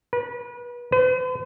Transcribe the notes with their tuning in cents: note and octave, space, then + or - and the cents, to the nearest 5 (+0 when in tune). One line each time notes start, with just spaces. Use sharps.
B4 -35
B4 +45